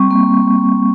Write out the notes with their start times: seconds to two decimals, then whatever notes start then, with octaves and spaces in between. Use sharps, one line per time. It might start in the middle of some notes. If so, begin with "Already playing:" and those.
Already playing: G3 C4 C#6
0.11 A#3